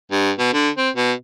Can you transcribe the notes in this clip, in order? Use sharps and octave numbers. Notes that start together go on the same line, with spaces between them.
G2
B2
D3
C4
B2